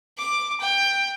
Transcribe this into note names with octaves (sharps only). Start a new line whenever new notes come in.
D6
G5